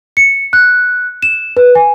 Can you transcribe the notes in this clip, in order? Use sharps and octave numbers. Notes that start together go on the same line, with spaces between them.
C#7
F#6
E7
B4
G#5